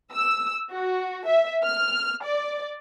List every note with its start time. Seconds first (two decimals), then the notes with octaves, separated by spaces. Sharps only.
0.14 E6
0.72 F#4
1.25 E5
1.63 F6
2.24 D5